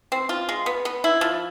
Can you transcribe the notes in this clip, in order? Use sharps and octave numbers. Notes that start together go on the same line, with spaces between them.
C4
F4
G#3
B3
B3
E4
F3